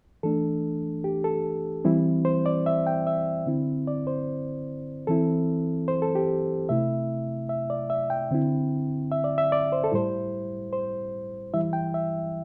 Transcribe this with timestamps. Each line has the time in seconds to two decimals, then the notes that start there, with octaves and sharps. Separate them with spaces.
0.23 E3 A3 D4 A4
1.04 G4
1.24 A4
1.85 E3 G3 C4 E4
2.25 C5
2.46 D5
2.66 E5
2.87 G5
3.07 E5
3.46 D3 C4 E4
3.87 D5
4.07 C5
5.07 E3 C4 E4 A4
5.88 C5
6.02 A4
6.15 G4
6.69 C3 A3 E4 E5
7.49 E5
7.70 D5
7.90 E5
8.10 G5
8.31 D3 C4 E4
9.12 E5
9.24 D5
9.38 E5
9.52 D5
9.72 C5
9.84 A4
9.92 A2 G3 E4 C5
10.73 C5
11.54 E3 G3 E4 E5
11.73 G5
11.94 E5